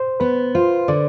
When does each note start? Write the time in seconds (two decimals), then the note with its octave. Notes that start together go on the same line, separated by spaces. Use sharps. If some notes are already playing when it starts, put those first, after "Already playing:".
Already playing: C5
0.20 B3 B4
0.55 F4 C5
0.88 D3 D5